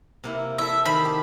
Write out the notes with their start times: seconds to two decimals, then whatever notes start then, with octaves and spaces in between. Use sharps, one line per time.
0.24 C3 A#3 E4
0.58 E4 A4 E5
0.85 D#3 C5 A5 B5
1.05 G4